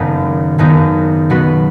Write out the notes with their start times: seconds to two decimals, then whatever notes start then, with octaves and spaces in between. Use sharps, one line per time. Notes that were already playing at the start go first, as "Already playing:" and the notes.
Already playing: F#1 F#2 D#3 B3 D#4
0.58 F#1 F#2 D#3 B3 D#4
1.30 B2 F#3 B3 F#4 B4